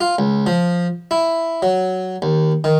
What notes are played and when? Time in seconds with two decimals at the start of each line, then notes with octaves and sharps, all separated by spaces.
0.01 F4
0.19 C#2
0.46 F3
1.11 E4
1.62 F#3
2.22 D#2
2.64 D#3